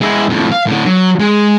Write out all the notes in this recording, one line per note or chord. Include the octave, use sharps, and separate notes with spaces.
G#3 E4
F2 A2
F5
A2 D3
F#3
G#3